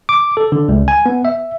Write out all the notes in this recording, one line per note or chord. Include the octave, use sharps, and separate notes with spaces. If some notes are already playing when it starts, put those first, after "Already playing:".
D6
A4
D3
C#2
G#5
B3
E5